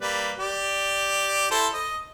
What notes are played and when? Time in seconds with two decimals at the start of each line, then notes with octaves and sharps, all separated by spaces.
0.01 G3 A#3 B4
0.38 G4 D5
1.51 E4 A4 C5
1.74 D#5